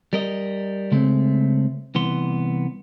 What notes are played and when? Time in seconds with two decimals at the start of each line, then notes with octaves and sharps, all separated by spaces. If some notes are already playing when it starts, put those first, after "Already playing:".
0.13 G3 A#4 D#5
0.92 C#3 G#3 A3 C4
1.95 C2 E3 B3 C6